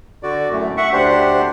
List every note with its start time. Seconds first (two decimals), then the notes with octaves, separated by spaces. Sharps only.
0.23 D3 F#4 D5
0.52 F#2 A2 A3
0.77 E5 F#5 C#6
0.93 D2 D4 G4 C5 F#5